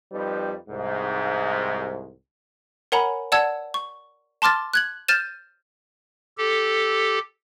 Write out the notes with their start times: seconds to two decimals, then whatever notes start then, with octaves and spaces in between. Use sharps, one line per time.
0.12 F2 G3 D#4 B4
0.69 C2 G#2
2.92 A#4 C#5 F#5 G#5 A#5 B5
3.32 D5 F#5 A5 E6 G#6
3.74 C#6
4.42 A5 C6 D6 F6 A6
4.74 F#6 G#6 F#7
5.08 F6 G6 A6 D#7 E7
6.38 G4 A4